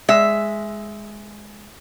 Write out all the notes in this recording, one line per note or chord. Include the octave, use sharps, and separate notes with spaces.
G#3 E5